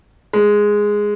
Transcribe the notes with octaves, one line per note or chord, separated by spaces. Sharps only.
G#3